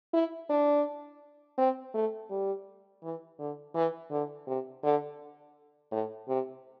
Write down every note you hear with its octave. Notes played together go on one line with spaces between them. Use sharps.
E4
D4
C4
A3
G3
E3
D3
E3
D3
C3
D3
A2
C3